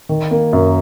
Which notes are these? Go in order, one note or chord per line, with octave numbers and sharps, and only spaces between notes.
D#3
A#3
F#2